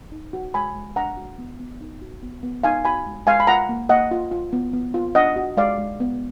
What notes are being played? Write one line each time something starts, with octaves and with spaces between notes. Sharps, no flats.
D#4
F#4
G#3 G#5 B5
G#3
D4 F#5 A#5
F#4
B3
B3
D#4
F#4
B3
B3
D#4 F5 G#5
F#4 G#5 B5
G#3
G#3 F5 G#5
B5
F4 F#5 A#5
A#3
A#3 D#5 F#5
F4
F4
B3
B3
F4
D4 D#5 F#5
F#4
G#3 D5 F5
G#3
B3